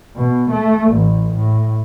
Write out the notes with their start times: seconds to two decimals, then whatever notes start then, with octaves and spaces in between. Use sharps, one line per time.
0.16 B2
0.51 A3
0.91 A1
1.35 A2